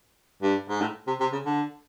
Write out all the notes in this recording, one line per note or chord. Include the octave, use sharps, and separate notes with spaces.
G2
G#2
A2
C3
C3
C#3
D3